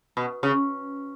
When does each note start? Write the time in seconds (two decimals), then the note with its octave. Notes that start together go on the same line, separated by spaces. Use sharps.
0.17 B2
0.43 C#3